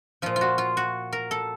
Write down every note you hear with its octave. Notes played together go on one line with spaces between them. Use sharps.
A#2 F3 F4
F4
F#4
F4
F#4
A#4
A4